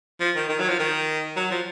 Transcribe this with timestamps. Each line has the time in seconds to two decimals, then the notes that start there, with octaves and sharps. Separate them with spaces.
0.20 F3
0.35 D#3
0.49 D#3
0.59 F#3
0.69 F3
0.79 D#3
1.36 F#3
1.51 F3